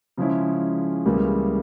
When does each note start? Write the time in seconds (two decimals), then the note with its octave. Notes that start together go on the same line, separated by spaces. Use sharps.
0.18 C#3 F3 G#3 C#4 E4
1.05 C#2 C#3 E3 G3 A#3